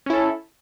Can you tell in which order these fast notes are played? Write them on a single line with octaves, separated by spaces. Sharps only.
C#4 E4 A4